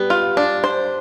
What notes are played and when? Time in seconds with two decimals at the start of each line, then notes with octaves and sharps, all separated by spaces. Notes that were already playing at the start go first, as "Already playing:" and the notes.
Already playing: G3 B3
0.10 F4
0.37 D4
0.64 C5